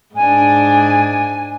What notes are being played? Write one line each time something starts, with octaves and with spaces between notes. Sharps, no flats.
G#2 D4 G#5